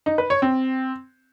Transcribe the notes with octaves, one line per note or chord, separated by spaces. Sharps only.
D#4
B4
C#5
C4